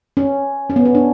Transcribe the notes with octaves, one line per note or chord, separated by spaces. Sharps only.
C#4
C#4
B3
C#4
D4